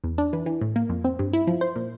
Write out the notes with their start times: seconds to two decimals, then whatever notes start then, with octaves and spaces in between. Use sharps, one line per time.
0.04 E2
0.18 D4
0.33 E3
0.46 E3
0.61 A2
0.76 A#3
0.89 F2
1.04 C4
1.19 G2
1.33 E4
1.47 F3
1.61 C5
1.76 A#2